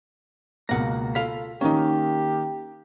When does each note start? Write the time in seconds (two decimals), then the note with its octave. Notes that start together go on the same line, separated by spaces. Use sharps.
0.69 C#2 B2 A#3 F#5 A#5
1.15 F4 A4 F5 B5
1.61 D#3 A#3 C#4 D#4 G4